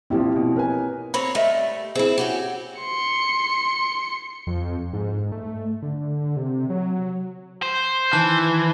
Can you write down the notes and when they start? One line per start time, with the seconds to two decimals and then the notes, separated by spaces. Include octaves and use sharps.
0.10 A#1 F3 C4 E4 G4
0.36 B2
0.56 A#4 B4 C#5 G#5
1.14 C4 A#4 C#5 B5
1.35 G3 A3 A#4 D#5 E5
1.95 C4 E4 G#4
2.18 C#4 F#4 G4
2.79 C6 C#7
4.47 F2
4.93 G#2
5.32 A3
5.82 D3
6.37 C3
6.70 F#3
7.62 C5
8.13 D#3 E3 A5 F#6